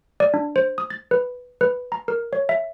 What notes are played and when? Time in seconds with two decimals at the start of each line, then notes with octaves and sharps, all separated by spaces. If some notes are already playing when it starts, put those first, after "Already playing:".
0.20 D5
0.34 D4
0.56 C5
0.78 D#6
0.90 A6
1.11 B4
1.61 B4
1.92 A#5
2.08 A#4
2.33 C#5
2.49 E5